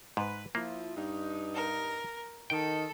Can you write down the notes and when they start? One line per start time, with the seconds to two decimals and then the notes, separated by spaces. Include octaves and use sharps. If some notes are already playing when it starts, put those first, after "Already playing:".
0.17 G#2 B4
0.55 F3 A#3 E4
0.96 G2 D#4
1.54 A#4
2.50 D#3 A4 G5